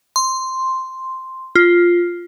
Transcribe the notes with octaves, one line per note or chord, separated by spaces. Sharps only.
C6
F4